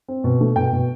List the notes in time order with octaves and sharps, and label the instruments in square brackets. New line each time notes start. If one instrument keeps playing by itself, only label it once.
[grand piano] C4
B2
A3
B2 G5
B2